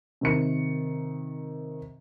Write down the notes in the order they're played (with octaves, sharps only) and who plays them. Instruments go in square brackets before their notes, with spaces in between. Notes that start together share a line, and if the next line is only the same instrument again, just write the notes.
[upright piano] C3 D#3 C#7